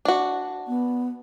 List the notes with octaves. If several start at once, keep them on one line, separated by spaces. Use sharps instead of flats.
D4 F#4
B3